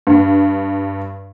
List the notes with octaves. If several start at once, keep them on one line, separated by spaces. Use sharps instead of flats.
G2